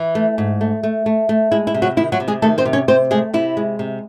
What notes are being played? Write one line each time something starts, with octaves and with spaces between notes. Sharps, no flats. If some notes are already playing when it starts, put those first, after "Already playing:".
Already playing: E3
A3
G#2
A3
A3
A3
A3
G#3 E4
E4
C3
F#3 F#4
D#3 E4
F#3 F#4
C3
G#3 G#4
D#3 A3 A4
C4 C5
C3
C#4 C#5
C3 C4 C5
G#3 A3 G#4
C3 E4
G#3
C3